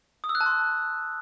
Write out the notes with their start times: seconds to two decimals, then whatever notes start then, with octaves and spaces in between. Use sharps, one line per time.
0.24 D#6
0.29 E6
0.35 F#6
0.41 A5
0.46 C6